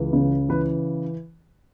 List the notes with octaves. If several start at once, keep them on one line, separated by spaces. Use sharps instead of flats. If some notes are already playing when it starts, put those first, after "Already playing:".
Already playing: C#2 E3
C#3
E3 B4